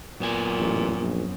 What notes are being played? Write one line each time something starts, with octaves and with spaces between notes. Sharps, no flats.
F#2 A#2 B3 G#5
A1
A#1